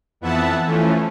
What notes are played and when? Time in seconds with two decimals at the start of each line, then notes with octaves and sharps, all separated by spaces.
0.21 F2 E3 B3 E5 F#5 A5
0.66 E3 F3 A3 C#4